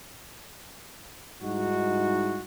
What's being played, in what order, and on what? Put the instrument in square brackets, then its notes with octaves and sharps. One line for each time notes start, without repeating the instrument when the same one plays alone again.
[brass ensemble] G#2 G3 G#3 D#4 E4 F#4